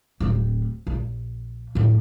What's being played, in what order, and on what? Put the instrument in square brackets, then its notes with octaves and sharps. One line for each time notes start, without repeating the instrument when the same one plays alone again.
[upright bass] D1 C4
A#1
F2 A2